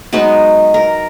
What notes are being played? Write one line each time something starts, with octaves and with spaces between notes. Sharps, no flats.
F#3 G#3 B3 D#4
A#4